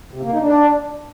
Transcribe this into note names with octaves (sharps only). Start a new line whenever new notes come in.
C3
A#3
D#4
D4